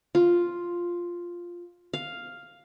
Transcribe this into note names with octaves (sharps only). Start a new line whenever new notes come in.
F4
F5